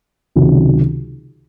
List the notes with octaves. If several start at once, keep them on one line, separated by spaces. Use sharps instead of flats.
C#2 C3 D#3 F#3